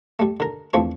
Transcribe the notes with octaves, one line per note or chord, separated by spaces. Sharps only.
G3 A3
D3 A#4
E2 F3 A3 C4 D4 C#6